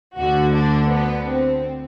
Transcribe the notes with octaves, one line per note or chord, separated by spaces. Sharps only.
D2 D3 F#4
D4
B3
C4